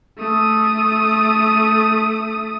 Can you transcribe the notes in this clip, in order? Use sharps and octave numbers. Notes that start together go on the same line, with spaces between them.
A3 D#6